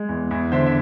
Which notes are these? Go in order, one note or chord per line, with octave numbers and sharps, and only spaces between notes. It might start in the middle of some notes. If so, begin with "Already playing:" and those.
Already playing: G#3
E2
E2
D3 C5 E5
E5